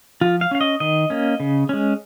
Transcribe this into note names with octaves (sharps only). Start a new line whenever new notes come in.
F3 F4
F5
C#4 F5
D#5
D#3 D#5
A#3 C#4
C#3
G#3 C#4